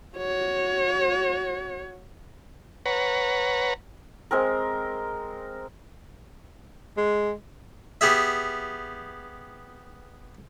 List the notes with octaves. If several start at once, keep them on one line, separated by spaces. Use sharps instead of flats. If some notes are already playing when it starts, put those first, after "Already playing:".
F#4 C#5
B4 C#5 F#5 A#5
G#3 C4 A#4
G#3
B3 G4 G#4 E5